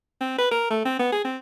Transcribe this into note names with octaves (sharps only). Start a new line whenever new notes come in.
C4
B4
A#4
A3
C4
B3
G#4
C4